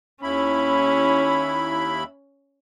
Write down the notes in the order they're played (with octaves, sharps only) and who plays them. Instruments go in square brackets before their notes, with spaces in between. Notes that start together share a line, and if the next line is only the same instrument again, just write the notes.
[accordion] D#2 E4 B5 [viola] C#4